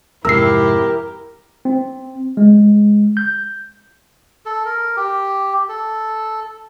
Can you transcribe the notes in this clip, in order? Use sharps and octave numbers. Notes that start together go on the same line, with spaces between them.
F2 G#2 C3 E4 G4 A#4 E6 C7
C4
G#3
G6
A4
A#4
G4
A4